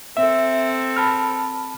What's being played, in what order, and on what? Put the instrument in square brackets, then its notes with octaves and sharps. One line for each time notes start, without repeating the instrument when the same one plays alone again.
[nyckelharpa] C4 A4 [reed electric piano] E5
[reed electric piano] A5 B5 F6